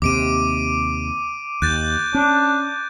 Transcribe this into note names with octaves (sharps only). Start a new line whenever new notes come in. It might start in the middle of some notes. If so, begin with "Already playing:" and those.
D#2 C3 D6 D7 D#7
D#2 F#6 G6 A6
C#4 D4